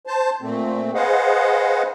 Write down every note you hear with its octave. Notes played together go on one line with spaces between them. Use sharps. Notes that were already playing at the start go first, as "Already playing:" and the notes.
C5 A5
A#2 A3 C4
G#4 B4 C5 D#5 F5 F#5